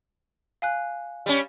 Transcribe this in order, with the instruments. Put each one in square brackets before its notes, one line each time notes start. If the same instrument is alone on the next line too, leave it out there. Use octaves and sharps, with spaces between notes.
[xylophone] F5 G#5 F#6
[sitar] G3 C#4